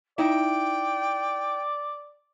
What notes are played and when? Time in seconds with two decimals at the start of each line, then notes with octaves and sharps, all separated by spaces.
0.18 D#4 E4 D5 E5 G5